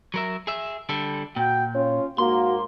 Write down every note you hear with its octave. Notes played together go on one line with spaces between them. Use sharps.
F#3 A#4 E5
G#4 E5
D3 G3 A4
A#2 F#4 G5
C#4 F4 C#5
G#2 A#3 F#4 C6